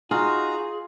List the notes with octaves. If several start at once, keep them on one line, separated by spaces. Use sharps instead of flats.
D#4 F4 F#4 G#4 A#5